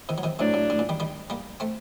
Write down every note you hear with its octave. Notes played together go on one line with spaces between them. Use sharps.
C3 D#3
F#3
C3 D#3
A2 C3 F#3 A3 D4
A2
A2
A#2
D#3 G3
D#3 G3
G3 A#3
A3 C4